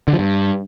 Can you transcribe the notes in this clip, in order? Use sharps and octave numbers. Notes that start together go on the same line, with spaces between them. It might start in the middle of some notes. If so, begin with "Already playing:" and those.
D3
F3
G2